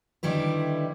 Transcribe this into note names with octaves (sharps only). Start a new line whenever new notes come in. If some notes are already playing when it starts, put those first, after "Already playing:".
D3 D#3 G3 E4 B4